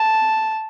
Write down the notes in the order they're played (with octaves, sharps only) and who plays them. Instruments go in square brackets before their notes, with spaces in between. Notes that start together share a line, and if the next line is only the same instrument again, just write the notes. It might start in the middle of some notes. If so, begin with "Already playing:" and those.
Already playing: [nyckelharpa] A5